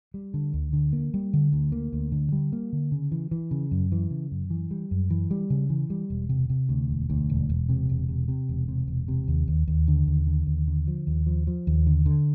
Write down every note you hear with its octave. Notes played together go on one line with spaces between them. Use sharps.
G3
D3
D2
D3
A#3
G3
D3
D2
A#3
D2
D3
G3
A#3
D3
C#3
E3
E3
C#3
F#2
E3
C#3
F#2
E3
G3
F#2
E3
G3
C#3
E3
G3
E1
C3
C3
D2
E1
D2
E1
E1
C3
E1
C3
C3
E1
C3
E1
C3
D#2
D#2
D#2
D3
D#2
D3
D#2
D3
F3
D#2
F3
F3
D#2
D3
D3